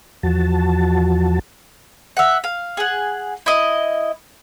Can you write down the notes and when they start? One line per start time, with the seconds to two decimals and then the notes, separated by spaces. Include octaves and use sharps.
0.23 E2 F3 F#4 A5
2.17 E5 F#5
2.44 F5
2.77 G#4 F#5
3.46 E4 D#5